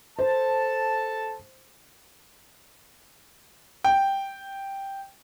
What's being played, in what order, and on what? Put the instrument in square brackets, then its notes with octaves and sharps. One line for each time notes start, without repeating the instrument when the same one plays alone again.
[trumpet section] A4 A5 [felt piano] C5
[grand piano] G5